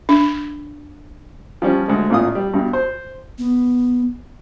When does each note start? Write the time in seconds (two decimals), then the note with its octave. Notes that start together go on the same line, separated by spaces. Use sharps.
0.09 D4
1.62 F3 G3 C#4
1.88 D2 G#3
2.10 A1 A#2 F4 D#6
2.35 G3
2.54 G2 B2
2.73 C5
3.39 B3